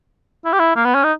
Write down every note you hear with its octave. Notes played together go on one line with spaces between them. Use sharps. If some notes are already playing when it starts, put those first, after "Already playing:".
E4
G4
E4
A#3
B3
C#4
D#4